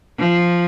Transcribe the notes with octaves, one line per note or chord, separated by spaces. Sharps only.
F3